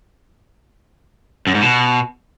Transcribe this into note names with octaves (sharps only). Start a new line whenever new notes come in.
F#2
G#2
B2